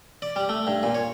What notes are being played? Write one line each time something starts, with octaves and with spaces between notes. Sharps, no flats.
D5
G3
A3
G2
A#2
C#5